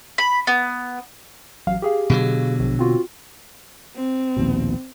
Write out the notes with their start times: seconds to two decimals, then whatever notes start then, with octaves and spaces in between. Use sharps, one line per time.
0.18 B5
0.47 B3
1.67 A1 F#3 F5
1.82 G4 G#4 F5
2.10 B2 D3 F#3
2.60 A#1
2.79 C4 F4 F#4
3.96 C4
4.37 A#1 D#2 B2